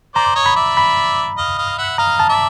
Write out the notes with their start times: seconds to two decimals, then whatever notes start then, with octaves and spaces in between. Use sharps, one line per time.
0.16 C5 D5 A#5
0.35 C#5 D#5
0.46 B5
0.56 D5 E5
0.77 B5
1.38 D#5 F5
1.58 D#5 F5
1.78 E5 F#5
1.98 D#5 F5 A#5
2.20 A5
2.29 D5 E5